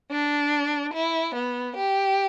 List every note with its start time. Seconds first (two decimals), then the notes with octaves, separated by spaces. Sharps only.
0.11 D4
0.94 E4
1.35 B3
1.76 G4